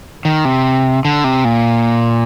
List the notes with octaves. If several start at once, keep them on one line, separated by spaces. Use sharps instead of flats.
D#3
C3
D3
C3
A#2